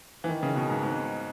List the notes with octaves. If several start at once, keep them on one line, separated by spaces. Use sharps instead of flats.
E3
D#3
C#3
B2
G#2
G#2